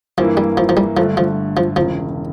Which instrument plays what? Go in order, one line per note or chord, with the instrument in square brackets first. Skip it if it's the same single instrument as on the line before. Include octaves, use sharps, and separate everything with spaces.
[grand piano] G2 E3 A#3 E4 [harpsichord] F3
[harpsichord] G3
F3
F3
G3
[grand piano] G1 G2 D3 A3 [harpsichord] F3
[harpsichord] F3
F3
[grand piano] E1 E2 C#3 [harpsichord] F3